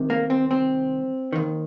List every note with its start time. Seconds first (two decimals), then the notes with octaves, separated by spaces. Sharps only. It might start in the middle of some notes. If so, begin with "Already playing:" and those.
Already playing: C2 C3 D#3
0.10 A#3
0.30 C4
0.51 C4
1.33 D#2 D#3